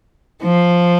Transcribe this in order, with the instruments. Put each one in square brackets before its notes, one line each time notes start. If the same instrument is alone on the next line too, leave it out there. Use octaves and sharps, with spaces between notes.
[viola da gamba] F3